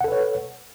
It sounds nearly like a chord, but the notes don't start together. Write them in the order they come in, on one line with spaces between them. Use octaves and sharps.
F#5 A4 B4 C#5